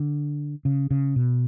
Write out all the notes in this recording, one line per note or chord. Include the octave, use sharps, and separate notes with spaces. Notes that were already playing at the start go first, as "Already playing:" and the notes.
Already playing: D3
C#3
C#3
B2